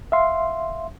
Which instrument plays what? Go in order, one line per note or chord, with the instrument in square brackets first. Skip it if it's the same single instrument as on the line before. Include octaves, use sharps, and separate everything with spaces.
[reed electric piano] E5 F5 C6